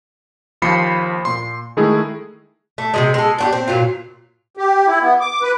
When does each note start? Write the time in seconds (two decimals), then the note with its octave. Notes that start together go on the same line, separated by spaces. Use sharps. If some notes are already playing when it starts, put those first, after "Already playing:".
0.62 D#2 F3 C5 B5 C7 C#7
1.25 A#2 C6
1.77 D#3 G#3 A3 E4 G#4
2.78 A3
2.94 C3 F3 G#3
3.14 G#3 A4
3.38 D4 F#4 G4
3.53 C4
3.68 A#2 F#3 F4
4.57 G4
4.87 E4
5.01 B3
5.20 D6
5.42 B4